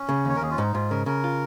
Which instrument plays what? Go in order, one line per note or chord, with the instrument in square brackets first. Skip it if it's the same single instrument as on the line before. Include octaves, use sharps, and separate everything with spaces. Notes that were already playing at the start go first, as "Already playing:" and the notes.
Already playing: [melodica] C#4
[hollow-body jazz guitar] C#3
[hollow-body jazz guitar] D#2 [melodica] C#5
[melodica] A#4
[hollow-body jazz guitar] D#2 [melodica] G#4
[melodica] F4
[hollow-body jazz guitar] G#2 [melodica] D#4
[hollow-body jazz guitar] G#2 [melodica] F4
[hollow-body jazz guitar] C#3 [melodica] A#4
[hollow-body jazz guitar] C#3 [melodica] A#4
[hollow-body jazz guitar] F4